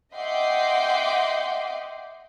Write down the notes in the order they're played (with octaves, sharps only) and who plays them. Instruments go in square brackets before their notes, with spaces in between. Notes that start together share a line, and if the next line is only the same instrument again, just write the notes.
[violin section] D#5 E5 F#5 G5 C6 D6